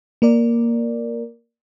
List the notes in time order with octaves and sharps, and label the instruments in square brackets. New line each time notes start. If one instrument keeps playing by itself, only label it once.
[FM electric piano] A#3 A#4 D5